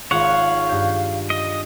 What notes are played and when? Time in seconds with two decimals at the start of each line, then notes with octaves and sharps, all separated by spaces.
0.11 G#1 F4 C#5 F5 F#5
0.69 G2 G6
1.30 D#5